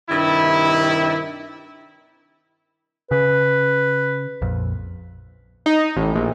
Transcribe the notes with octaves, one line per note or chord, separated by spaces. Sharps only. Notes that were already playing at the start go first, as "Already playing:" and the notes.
G2 C3 D#3 E4
C#3 B4
A#1 F2
D#4
A1
A#1